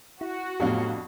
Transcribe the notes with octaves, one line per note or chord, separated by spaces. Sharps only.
E4 F#4
F2 A2 F3 F#3 B3 D4 G4 F5